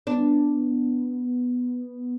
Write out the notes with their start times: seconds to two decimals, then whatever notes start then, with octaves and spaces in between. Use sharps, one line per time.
0.07 B3 D4